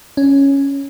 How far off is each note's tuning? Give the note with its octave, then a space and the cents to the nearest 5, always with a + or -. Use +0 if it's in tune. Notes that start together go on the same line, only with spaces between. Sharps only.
C#4 +0